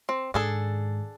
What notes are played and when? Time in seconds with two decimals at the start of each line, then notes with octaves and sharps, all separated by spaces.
0.09 C4
0.34 G#2 D#3 D4 G#4 A4